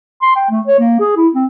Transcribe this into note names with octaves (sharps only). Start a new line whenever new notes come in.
C6
G5
A3
C#5
A#3
G#4
E4
C4